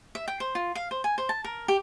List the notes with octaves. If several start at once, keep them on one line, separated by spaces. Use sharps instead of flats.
E5
G5
C5
F4
F5
C5
G#5
C5
A5
A#4
G4